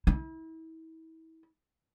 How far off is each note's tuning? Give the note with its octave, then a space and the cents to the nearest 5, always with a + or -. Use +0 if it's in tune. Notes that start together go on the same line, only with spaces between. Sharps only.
E4 -35